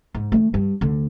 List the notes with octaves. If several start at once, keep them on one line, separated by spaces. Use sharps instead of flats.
G#2
D#3 A3
G2
D2 D3